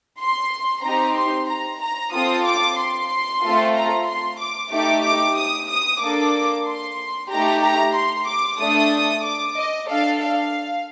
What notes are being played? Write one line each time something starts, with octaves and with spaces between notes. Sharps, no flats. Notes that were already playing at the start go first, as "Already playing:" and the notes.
C6
C4 D#4 G4 A#5
C6
A#5
A#5
C4 F4 A4 D#6
D6
C6
A3 C4 F4 A4
A#5
C6
D6
A3 D#4 G4 D6
D6
D#6
D#6
A#3 D4 A4 D6
C6
A3 D#4 G4 A#5
A#5
C6
D6
A3 D4 A4 D#6
D6
D#5
D4 A4 F5
F5